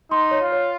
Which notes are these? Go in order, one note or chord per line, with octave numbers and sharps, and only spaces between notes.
D#4 C6
C#5
F4
C#5